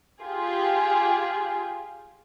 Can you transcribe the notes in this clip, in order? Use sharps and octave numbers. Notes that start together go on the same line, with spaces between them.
F4 G4 G#4